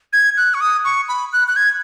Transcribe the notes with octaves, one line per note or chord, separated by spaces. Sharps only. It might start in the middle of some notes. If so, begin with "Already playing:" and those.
G#6
F#6
C#6
D#6
C#6
B5
F#6
F#6
G#6